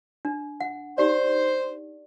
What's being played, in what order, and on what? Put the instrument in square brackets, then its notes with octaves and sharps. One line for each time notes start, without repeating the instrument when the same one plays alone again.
[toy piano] D4
F#5
[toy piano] D#4 G4 D5 [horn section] C5